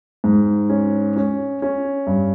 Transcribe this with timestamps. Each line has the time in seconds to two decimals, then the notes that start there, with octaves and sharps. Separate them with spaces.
0.24 G#2
0.70 C#4
1.16 C#4
1.62 C#4
2.07 G2